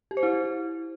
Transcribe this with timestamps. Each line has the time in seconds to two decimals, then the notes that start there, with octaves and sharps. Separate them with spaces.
0.11 G4
0.17 C5
0.23 E4